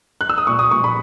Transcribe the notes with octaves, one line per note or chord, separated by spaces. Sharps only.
F#6
E6
D#6
A#2 C#6
D#6
A#2 C#6
B5